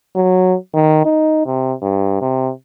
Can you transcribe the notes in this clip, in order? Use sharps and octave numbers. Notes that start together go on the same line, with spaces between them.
F#3
D#3
D#4
C3
G2
C3